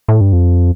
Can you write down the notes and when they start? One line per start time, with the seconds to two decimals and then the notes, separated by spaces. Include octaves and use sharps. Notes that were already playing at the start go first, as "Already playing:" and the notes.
0.08 A2
0.21 G2
0.33 F2